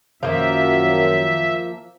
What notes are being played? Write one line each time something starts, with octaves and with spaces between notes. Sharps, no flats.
F#2 D#3 F3 A#3 E5